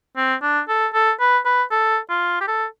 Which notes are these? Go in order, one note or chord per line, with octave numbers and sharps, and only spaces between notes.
C4
D4
A4
A4
B4
B4
A4
F4
G4
A4